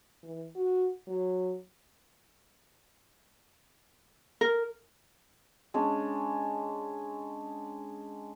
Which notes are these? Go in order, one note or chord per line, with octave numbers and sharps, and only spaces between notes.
E3
F#4
F#3
A#4
G#3 C#4 D4